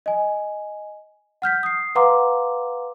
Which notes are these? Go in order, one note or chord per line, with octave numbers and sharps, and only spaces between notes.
D#5 G#5
F#5 F6 G6 B6
D#6 C7
B4 F5 F#5 A#5 C6 D6